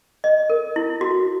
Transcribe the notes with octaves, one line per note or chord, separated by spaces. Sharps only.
D#5
A#4
E4
F#4